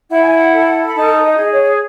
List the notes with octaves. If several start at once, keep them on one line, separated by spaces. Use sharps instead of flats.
E4 F#5
G#5
F#5
A4
B5
D#4 A5
D#5
G#4
C#5